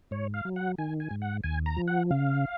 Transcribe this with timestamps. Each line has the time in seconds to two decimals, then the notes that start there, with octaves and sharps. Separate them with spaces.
0.11 G#2 C#5
0.34 F5
0.45 F#3
0.56 F#5
0.78 D#3 G#5
1.00 G#5
1.11 G#2
1.22 F#5
1.44 D#2 G#5
1.66 A#5
1.76 F3
1.88 F#5
2.11 C#3 F5